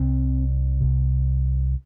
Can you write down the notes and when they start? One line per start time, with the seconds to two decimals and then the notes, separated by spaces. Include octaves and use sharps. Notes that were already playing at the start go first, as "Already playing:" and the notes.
Already playing: C2 C3 C4
0.81 C2 C3